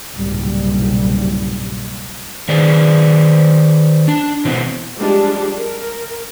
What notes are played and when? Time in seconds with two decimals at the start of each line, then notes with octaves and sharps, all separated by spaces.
0.15 F#1 C2 G#2 B2 G3
2.48 D#3 G#4 B4 C5 D5
4.08 D4 A5
4.45 B2 E3 C4
4.97 F3 G3 G#3 D4 G4
5.56 A#4